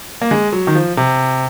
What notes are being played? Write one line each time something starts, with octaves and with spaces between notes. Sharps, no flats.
A#3
G#3
F#3
D#3
F3
C3